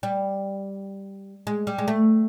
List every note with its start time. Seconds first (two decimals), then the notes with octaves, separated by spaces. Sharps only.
0.03 G3
1.47 G#3
1.67 G3
1.78 G#3
1.88 A3